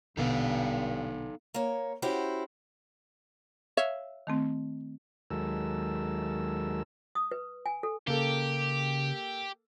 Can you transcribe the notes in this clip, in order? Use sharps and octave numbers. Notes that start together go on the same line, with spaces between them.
A#1 G2 B2 D3 B3 D#4 A4 F5
A#3 C#5
C#4 E4 F#4 G4 C5
C#5 E5 F5
D#3 A3 C4
D#2 F#3 G#3 A4 A#4 E6
D#6
B4
G#5
A4
C#3 A#3 G4 A4